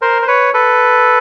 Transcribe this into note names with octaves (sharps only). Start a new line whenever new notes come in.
A#4 C5
C5
B4 C#5
A4 B4